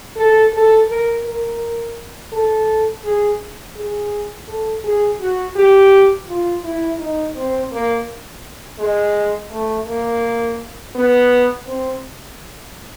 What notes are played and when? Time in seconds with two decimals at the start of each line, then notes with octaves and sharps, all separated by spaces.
0.16 A4
0.53 A4
0.89 A#4
1.24 A#4
2.33 A4
3.05 G#4
3.76 G#4
4.48 A4
4.84 G#4
5.20 F#4
5.56 G4
6.28 F4
6.64 E4
6.99 D#4
7.36 C4
7.72 A#3
8.79 G#3
9.51 A3
9.87 A#3
10.95 B3
11.66 C4